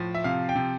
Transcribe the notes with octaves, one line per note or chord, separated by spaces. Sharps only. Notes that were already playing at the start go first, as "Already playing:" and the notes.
Already playing: A2 F3
E5
C3 F5
G5
C3